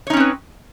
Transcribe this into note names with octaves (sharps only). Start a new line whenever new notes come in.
C4 C#4 D#4 B4 C#5